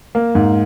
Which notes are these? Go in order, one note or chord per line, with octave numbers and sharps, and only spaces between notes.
A#3
G#2